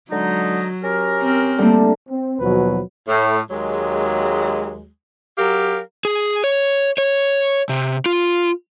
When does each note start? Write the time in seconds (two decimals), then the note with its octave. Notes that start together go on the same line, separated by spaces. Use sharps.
0.11 D3 F#3 G#3 D#4
0.83 C#4 G4 A#4
1.22 C4
1.58 D3 G3 A3 A#3
2.09 C4
2.39 D#2 B2 F3 F#3 B4
3.08 A2
3.51 D#2 F#3 G#3
5.38 F#3 G4 A#4 F5
6.05 G#4
6.44 C#5
6.98 C#5
7.69 C3
8.06 F4